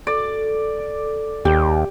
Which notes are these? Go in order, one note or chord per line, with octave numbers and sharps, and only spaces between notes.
A4 D5
D#2 G4